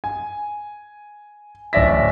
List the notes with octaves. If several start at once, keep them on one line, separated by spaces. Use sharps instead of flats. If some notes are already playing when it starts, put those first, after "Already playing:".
G#5
D1 C#4 D5 E5 A#6 B6